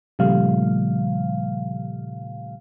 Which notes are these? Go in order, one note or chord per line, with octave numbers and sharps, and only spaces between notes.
A#2 C#3 F3 G3 A3 F5